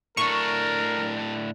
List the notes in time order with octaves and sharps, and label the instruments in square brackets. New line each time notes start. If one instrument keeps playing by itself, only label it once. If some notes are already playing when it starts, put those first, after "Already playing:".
[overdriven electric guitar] A2 D4 [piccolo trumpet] A#4 [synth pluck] C#6